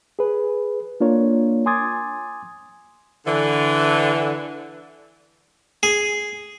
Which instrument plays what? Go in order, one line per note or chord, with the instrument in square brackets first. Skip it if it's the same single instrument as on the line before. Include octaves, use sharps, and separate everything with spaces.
[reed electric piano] G#4 B4
A#3 D4 F4 A#4 C#5
G#5 C6 D6 D#6 G#6 A6
[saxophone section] D3 E3
[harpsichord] G#4